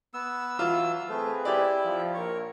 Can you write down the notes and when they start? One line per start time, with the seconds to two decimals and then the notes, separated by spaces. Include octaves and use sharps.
0.14 B3 E6
0.59 E3 F#3 F4 E6
1.09 A3 C4 G#4 B4
1.45 E4 G4 D5
1.84 F3
2.14 A#1 A#4 C#5